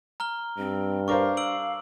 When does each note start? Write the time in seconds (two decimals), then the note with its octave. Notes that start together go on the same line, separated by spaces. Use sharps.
0.20 A#5 F6 G7
0.58 G2 C4
1.08 D4 A#4 C5 F5 C#6 D6
1.37 E6 D7 F#7